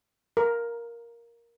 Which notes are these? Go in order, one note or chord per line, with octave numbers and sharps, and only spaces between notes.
A#4